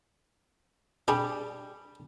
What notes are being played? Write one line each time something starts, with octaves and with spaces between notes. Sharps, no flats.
G3 D4 G#4